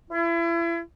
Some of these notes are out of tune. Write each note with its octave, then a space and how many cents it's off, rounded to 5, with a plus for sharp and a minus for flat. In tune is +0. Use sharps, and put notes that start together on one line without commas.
E4 +35